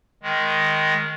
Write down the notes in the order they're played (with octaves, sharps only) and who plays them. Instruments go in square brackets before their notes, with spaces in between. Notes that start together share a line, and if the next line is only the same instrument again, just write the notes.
[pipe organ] D#3 G#3